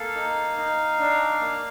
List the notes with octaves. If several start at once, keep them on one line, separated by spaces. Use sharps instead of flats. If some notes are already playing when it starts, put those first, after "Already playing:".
Already playing: A#3 A4 F5
D#4
D#4
D4
A#3